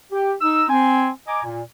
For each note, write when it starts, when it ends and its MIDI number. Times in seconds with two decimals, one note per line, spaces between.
0.12 0.32 67
0.41 0.65 63
0.41 0.65 88
0.69 1.09 60
0.69 1.09 80
1.27 1.41 75
1.27 1.41 80
1.27 1.41 82
1.27 1.41 86
1.44 1.61 46